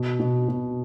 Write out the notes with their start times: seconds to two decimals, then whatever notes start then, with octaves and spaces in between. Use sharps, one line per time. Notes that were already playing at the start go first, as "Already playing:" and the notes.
Already playing: B2
0.19 B2
0.48 B2